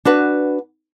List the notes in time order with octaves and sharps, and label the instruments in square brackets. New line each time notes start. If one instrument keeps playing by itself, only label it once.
[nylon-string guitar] D4 F#4 B4